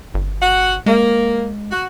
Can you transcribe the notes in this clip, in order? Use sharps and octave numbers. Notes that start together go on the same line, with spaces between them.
G1
F#4 F#5
G#3 A#3
F#4